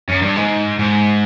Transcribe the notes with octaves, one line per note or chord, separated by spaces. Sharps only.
F#2
G2
G#2
G#2